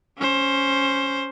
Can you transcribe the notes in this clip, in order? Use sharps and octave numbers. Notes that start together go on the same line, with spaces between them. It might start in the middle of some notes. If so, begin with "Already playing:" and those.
C#4 C5